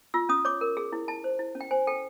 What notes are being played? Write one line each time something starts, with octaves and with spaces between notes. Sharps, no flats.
F4 E6
C#4 D#6
C#5 D6
A#4
G#4
E4
E4 A5
C5
E4
C#4
G5
C5 G#5
A4 G5